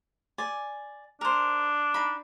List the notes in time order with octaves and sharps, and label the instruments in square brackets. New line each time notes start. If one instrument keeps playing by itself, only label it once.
[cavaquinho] D5 G#5
[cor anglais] D4 [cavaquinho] A#4 C5
[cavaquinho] D#4 B5